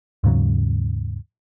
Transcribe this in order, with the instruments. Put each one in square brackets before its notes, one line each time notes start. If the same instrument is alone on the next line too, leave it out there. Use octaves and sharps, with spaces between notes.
[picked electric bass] D#2 G#2 C#3 F#3